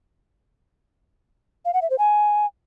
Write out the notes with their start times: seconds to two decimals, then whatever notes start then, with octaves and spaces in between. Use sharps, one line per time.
1.65 F5
1.73 F#5
1.82 E5
1.90 C5
1.98 G#5